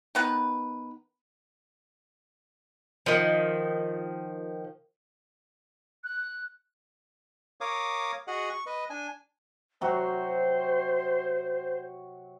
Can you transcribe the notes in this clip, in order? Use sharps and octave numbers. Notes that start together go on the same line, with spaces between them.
D#3 B3 B4
D#3 F3
F#6
A#4 C#5 F5 D6 D#6
F#4 G#4 D#5 F#5
C#6
B4 D#5
D4 G#5
C3 F#3 F#4 C5